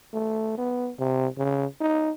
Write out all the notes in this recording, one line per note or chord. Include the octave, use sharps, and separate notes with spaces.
A3
B3
C3
C#3
D#4